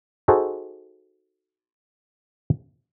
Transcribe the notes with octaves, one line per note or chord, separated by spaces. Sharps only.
D#4 F#4 G#4 A4 C5